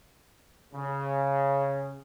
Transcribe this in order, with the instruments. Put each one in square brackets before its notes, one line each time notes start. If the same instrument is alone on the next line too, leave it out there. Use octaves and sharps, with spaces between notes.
[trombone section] C#3